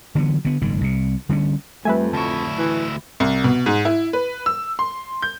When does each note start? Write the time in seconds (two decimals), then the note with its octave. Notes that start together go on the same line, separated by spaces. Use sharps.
0.15 D3 E3 F#3 B3
0.45 D3 B3
0.61 F#1 G#2 D#3
0.81 C2 C3
1.29 D3 G3 A#3 C#4
1.85 F2 G3 A3 B4 E5 G#5
2.13 D2 E4 A5 C#6
2.58 E3
3.20 C2
3.44 B2
3.66 G#2
3.85 E4
4.13 B4
4.46 E6
4.79 C6
5.22 G6